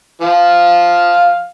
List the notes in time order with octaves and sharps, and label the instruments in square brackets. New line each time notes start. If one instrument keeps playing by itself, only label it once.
[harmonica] F3 F5